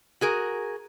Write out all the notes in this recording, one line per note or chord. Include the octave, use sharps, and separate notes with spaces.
F#4 G#4 A#4